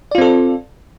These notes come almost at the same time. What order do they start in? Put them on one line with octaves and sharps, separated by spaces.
D5 F4 C4 A4